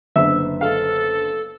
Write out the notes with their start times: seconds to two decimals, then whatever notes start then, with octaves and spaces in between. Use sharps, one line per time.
0.16 F#1 D3 B3 E5
0.61 A4 F5